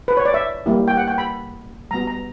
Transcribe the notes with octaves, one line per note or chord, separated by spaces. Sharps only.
B4
C#5
D5
E5
G3 A#3 E4 G4
G5
F#5
G5
B5
G3 B3 F#4 A#5
A#5